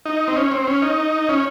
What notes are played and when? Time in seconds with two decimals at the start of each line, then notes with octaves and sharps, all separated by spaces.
0.06 D#4
0.28 C4
0.36 C#4
0.52 C4
0.67 C#4
0.82 D#4
1.29 C#4